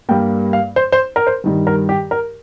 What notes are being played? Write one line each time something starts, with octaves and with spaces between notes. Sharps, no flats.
G2 G3 A#3 G5
F5
C5
C5
A#4
C5
G2 D#3 G3
A#4
G4
A#4